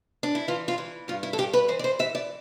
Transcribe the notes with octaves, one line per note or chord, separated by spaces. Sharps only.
D4
E4
E3 F4
F4
E3
G2 F4
E4
A4
G2 G4
B4
E3 C5
D5
C5
E3 E5
D5